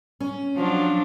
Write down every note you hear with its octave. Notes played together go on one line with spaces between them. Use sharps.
C#4
F3 F#3 D4